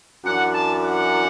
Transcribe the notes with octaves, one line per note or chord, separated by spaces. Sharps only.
F#2 E3 D4 F#5
A5
F#5